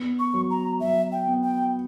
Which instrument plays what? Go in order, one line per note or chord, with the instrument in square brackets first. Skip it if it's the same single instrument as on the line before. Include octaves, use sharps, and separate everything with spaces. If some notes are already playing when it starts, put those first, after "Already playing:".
Already playing: [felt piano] B3
[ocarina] C#6
[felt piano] F#3
[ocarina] A#5
[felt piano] F#3 [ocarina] E5
[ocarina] G5
[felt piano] B3
[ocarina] G5